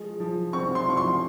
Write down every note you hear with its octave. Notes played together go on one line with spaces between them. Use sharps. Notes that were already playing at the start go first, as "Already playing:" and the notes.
Already playing: F3 G#3
F3
C4 C#6
C6
F3 C#6
C6